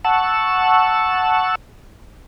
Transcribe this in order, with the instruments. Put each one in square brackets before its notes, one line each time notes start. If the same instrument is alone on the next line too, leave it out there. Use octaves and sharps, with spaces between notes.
[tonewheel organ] F#5 A5 C#6 E6